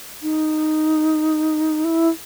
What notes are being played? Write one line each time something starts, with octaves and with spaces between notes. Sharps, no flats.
D#4
E4